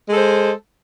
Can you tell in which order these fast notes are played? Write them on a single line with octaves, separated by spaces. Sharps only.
G#3 A4 C5